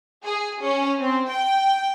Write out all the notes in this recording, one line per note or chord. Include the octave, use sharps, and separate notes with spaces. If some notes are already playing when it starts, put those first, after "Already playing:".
G#4
C#4
C4
G5